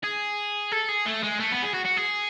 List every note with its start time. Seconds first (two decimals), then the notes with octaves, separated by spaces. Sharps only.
0.03 G#4
0.72 A4
0.89 G#4
1.06 A3
1.23 G#3
1.40 A3
1.51 B3
1.62 G#4
1.74 F#4
1.85 F#4
1.97 G#4